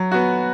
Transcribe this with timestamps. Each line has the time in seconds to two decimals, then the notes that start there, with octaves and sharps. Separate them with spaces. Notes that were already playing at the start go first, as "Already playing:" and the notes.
Already playing: F#3
0.12 B3 F#4